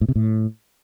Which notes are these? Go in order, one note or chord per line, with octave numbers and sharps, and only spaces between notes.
A2
C3
A2